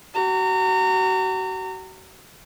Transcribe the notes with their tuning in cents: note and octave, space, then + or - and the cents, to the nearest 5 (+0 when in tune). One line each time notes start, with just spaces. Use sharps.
F#4 +35 A#5 -30